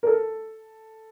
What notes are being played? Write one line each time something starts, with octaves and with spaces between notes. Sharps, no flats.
A#4
A4